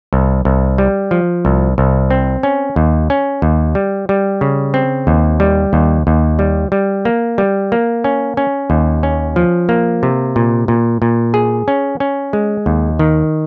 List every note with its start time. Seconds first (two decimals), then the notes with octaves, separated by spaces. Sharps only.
0.13 C2
0.45 C2
0.78 G3
1.11 F3
1.45 C2
1.78 C2
2.11 C4
2.43 C#4
2.76 D#2
3.10 C#4
3.42 D#2
3.75 G3
4.09 G3
4.41 C#3
4.74 C4
5.07 D#2
5.40 G3
5.73 D#2
6.07 D#2
6.39 G3
6.72 G3
7.05 A#3
7.38 G3
7.72 A#3
8.04 C#4
8.37 C#4
8.70 D#2
9.03 C#4
9.36 F3
9.69 A#3
10.03 C3
10.36 A#2
10.68 A#2
11.02 A#2
11.34 G#4
11.68 C#4
12.00 C#4
12.33 G#3
12.66 D#2
12.99 D#3